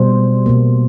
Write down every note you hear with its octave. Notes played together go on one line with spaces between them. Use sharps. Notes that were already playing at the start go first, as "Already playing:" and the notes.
Already playing: B2 G3 A#3 C5
B2 G3 A#3